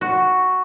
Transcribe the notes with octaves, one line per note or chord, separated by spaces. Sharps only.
F#4